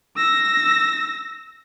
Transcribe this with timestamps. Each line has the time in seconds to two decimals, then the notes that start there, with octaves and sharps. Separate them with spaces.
0.17 E6 A#6